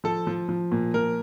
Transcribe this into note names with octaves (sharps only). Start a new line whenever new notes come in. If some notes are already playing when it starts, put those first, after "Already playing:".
F3 A4
F3
F3
A#2
F3 A#4